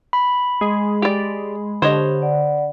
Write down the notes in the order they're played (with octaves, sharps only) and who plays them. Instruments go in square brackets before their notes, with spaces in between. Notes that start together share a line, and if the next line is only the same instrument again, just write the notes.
[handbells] B5
[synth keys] G#3
[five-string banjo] G4 D5
[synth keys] D3 [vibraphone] G4 [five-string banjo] C5 C#5 D#5
[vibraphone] D5 F#5